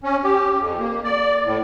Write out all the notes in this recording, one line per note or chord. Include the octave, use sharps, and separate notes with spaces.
C#4
G4
F2
A#3
D5
A2